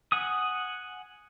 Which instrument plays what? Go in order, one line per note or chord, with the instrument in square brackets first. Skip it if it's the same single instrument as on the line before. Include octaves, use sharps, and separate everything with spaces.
[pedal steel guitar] F#5 G#5 D#6